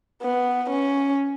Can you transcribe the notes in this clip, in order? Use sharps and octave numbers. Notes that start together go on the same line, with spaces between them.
B3
C#4